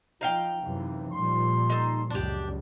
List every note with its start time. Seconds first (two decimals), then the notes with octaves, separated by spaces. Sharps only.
0.21 F3 D#4 F5 G5
0.61 F#2 C3 E3
1.12 A#2 F3 G3 C6
1.70 D#4 A4
2.10 C#2 F#2 D4 G4